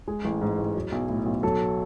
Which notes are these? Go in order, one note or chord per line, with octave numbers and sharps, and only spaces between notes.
G#3 G#4
A1
G#2
A1
F#3
B1
A2
B1
F#3 A4